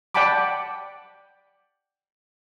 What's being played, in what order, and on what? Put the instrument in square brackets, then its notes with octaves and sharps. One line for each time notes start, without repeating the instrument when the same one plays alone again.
[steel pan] D5 F#5 G5 A5 B5 D6